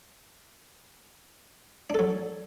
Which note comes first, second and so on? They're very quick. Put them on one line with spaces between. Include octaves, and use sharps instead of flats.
D4 A4 F#3